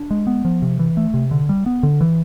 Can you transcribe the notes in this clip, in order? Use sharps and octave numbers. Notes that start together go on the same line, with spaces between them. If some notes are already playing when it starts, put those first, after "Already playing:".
Already playing: D4
G#3
B3
F3
C3
E3
A3
C3
D3
G3
B3
D3
E3